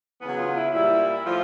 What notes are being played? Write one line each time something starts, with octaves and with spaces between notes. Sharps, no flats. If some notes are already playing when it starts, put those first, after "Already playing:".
E2 C#3 F#3 B3
F4
E4
A#2 G3 E4
A2 F3 F4